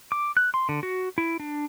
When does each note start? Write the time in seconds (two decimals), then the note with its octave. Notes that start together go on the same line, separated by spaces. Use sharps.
0.12 D6
0.37 F#6
0.54 C6
0.69 D3
0.83 F#4
1.18 E4
1.40 D4